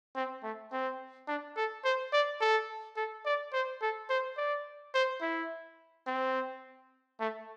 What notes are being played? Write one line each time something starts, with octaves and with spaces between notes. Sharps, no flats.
C4
A3
C4
D4
A4
C5
D5
A4
A4
D5
C5
A4
C5
D5
C5
E4
C4
A3